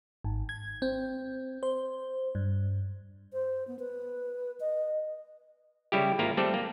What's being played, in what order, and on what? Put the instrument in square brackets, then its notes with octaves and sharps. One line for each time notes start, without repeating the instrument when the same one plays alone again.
[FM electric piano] G#1
G#6
C4
C5
G2
[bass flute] C5
B3
B4
D#5
[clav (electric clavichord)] C#3 G3 E4 G4
G#1 A#3 E4 F4 A#5
G3 A3 C4 A4 D5
A#3